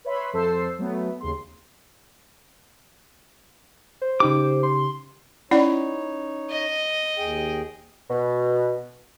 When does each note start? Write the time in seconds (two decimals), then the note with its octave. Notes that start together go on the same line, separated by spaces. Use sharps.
0.05 B4 C#5 E5 B5 C6
0.33 F2 A4 C5 A5 E6 C7
0.79 F#3 A3 B3
1.21 D#2 C#3 C6
4.02 C5
4.20 C#3 D#4 G4 D6
4.63 C6
5.51 C#4 D#4 E4 C#5 D5 B5
6.50 D#5
7.18 D#2 G#4 G5
8.10 B2